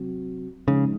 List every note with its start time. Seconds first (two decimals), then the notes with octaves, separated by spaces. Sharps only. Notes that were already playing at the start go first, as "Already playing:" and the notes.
Already playing: C3 F#3 C4 F#4
0.68 C#3 F3 G#3 D#4